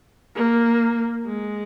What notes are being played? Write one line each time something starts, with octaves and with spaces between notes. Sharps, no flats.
A#3
G#3